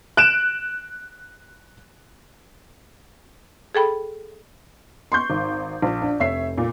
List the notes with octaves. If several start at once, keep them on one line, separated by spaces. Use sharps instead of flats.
F#6 D7 E7
G#4 A4 G5 B5
C6 C#6 G6
G#1
A#1
D4
F1 C#5 E5 C7
A#2